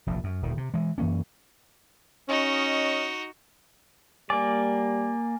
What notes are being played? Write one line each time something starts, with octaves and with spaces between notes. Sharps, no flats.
F1 A#1 E2 A#2
F#2
D#1 D#3
C3
E3 G#3
F#2 E3 A#3 C#4
C#4 D#4 F#4 D#5
G3 A#3 D5 G#5